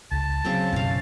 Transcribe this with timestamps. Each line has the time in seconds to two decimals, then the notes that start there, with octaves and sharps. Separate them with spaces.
0.12 C#2 A5
0.44 C#3 F#3 C4 G5
0.73 F#2 B2 C#4 F5